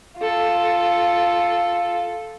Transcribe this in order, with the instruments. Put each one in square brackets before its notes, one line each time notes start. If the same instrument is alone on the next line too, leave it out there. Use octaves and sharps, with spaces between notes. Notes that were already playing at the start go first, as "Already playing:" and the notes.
[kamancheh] F4 A4